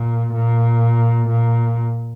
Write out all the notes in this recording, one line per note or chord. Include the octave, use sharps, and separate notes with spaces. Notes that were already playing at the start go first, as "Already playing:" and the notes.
Already playing: A#2
A#2
A#2